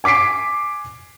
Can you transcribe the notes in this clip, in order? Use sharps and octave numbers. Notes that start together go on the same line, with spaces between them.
G#5 D6 B6 C7 D7